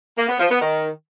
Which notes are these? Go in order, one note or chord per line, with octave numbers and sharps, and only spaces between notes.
A#3
B3
F3
B3
D#3